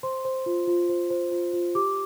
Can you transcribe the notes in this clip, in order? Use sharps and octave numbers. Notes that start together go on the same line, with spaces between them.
C5 C6
C5
F4
F4
C5
C5
F4
F4
G4 D6